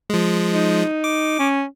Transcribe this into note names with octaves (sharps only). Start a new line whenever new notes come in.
F3 G#3
D#4
D6
C#4